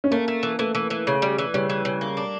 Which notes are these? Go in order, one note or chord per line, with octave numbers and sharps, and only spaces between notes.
C#4
A3 A#3
A3
E3
E3 A3
E3
E3
C#3
G3
E3
C#3 G3
E3
C#3
A#3
D4